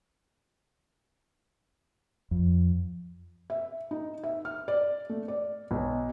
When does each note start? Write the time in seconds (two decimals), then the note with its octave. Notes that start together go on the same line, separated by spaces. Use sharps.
2.31 F2
3.50 E5
3.91 D#4
4.24 E5
4.45 F6
4.68 D5
5.09 A3
5.28 D5
5.71 B1